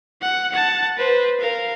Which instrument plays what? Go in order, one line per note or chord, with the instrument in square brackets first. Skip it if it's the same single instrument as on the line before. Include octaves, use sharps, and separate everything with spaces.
[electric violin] F#5
F#5 A5
B4 C5
A#4 F5